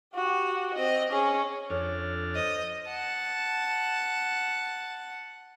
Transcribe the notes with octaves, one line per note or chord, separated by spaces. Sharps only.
F#4 G4
C4 D#5
C#4 G#4
F2 D4 A4 C#5 F6
C5 D#5
F#5 A5